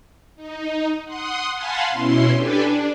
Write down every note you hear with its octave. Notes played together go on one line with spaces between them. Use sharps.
D#4
F#5 C6 D#6
F5 F#5 G#5 A5 B5 C6
B2 C#4 E4 C6
D4 G4 A4 B4 G#5
D4